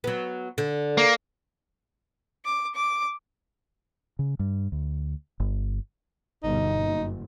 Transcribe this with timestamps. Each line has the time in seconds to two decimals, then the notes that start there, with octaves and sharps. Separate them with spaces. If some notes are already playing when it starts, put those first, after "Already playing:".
0.04 F#3 B3
0.58 D3
0.98 A#3
2.45 D6
2.76 D6
4.19 C#3
4.39 G2
4.72 D2
5.40 G1
6.43 G1 B2 D#4
6.79 F#1